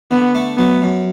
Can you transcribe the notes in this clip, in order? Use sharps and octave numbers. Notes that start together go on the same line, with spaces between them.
D3 B3
A3
F#3 B3
F#2